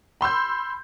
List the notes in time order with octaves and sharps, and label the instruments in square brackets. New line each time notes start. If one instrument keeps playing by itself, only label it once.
[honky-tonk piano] B5 C6 E6 G6